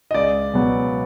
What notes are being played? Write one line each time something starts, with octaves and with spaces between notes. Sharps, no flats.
D#5
C#2 D5
B2 F#3 B3